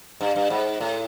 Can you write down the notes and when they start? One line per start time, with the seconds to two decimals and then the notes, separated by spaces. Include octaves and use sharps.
0.21 G2
0.36 G2
0.50 G#2
0.80 A2